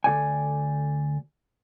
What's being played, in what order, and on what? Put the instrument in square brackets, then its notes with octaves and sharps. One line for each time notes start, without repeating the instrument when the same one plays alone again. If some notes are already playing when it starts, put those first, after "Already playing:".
[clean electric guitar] D2 A3 A4 D5 G5 G#5